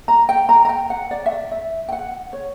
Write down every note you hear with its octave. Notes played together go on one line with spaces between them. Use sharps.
A#5
G5
A#5
A#5
G5
F#5
D5
E5
D5
E5
G5
F#5
C#5